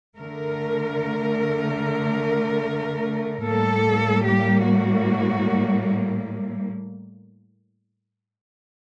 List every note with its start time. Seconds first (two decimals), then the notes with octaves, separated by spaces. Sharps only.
0.18 D3 A3 A#4
3.44 A2 G3 A#3 A4
4.25 G4
4.66 F#4